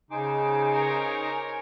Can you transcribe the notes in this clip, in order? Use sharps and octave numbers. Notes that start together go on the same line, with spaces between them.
C#3 D#4 C5 G#5 D6
A#4 C#5